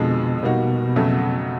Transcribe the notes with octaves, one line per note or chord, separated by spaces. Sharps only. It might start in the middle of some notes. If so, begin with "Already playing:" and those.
Already playing: F2 B2 D3 F3 G#3
B2 G3 A#3 D#4 F#4
F2 C#3 F#3 A3